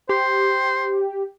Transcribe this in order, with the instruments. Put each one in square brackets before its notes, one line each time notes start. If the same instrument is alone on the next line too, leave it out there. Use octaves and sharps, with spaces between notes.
[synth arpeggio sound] G4 [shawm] C5